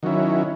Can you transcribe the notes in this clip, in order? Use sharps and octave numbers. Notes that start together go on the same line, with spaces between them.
D#3 F#3 C#4 E4